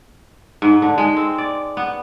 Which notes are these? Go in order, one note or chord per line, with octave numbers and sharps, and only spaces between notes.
G#2
D3
G#3
C4
D5
B3